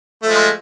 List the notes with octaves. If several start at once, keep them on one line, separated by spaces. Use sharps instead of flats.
F3 G#3 A3